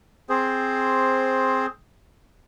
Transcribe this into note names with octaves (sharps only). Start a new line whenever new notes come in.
C4 G#4 C5